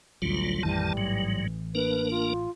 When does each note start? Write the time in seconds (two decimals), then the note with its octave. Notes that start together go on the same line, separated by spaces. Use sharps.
0.22 A1 D2 F#3 G3 F4
0.63 A1 F2 D#3 E3 G3 A5
0.97 G#2 F#3
1.75 A#3 D4 A#4 B4
2.11 F4